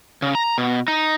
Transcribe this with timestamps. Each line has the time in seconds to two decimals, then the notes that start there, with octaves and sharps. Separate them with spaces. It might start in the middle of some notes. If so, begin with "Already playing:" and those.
0.22 C#3
0.35 A#5
0.58 B2
0.88 D#4